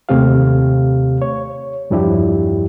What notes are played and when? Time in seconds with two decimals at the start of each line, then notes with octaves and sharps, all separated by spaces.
0.09 D#2 C3 A3 C4 G4 F5
1.22 C#5
1.90 E2 G2 F3 D4 E4 G4